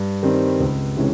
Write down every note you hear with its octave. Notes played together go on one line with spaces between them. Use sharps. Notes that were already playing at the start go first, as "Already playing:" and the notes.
Already playing: G2
D#3 G3 C4
C#2
C3 E3 G#3 C#4